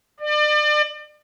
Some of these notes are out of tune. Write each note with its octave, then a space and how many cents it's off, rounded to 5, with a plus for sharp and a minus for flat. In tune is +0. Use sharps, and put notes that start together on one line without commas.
D5 +35